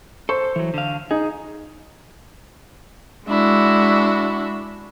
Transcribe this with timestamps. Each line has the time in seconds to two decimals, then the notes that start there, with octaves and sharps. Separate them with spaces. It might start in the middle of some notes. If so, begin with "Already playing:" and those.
0.29 A4 C5 C#6
0.56 E3 F#3
0.74 D3 F5
1.11 D#4 G#4
3.26 G#3 D4 E4 F#4